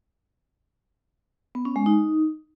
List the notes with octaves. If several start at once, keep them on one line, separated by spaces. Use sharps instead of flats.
B3
C#4
G#3
D#4